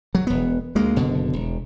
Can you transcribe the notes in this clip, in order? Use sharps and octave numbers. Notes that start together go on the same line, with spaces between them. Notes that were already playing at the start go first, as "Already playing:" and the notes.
F#3
E1 B3
D2 G#3 A#3
F#1 B2 D3
E1